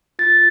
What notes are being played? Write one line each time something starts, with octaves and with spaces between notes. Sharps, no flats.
F4 A6